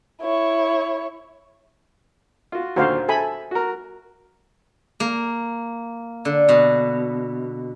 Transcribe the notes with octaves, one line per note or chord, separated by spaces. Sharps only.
E4 C#5
F4 F#4
D#2 A#2 D3 F#4 C5 F5
A4 E5 G#5 B5
F#4 A#4
A#3
D3
B2